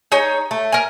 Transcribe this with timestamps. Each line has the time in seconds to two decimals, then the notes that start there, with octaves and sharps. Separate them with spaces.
0.12 D#4 G#4 C#5
0.51 A3
0.72 A#4 G#5